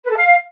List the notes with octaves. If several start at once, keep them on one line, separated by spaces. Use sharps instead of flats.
B4
A4
F5